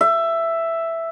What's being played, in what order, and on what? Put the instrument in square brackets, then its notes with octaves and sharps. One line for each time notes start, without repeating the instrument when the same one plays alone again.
[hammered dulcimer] E5